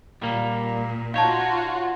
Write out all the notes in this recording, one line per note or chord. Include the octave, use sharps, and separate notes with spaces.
A#2 G3 A#3
D#4 F4 F#4 C#5 F5 A5